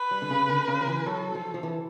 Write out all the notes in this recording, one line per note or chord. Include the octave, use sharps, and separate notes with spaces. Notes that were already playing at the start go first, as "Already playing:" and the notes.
Already playing: B4
G3
D3
C#3
D3
C#3
F3
E3
F#3 A4
F3
F3
E3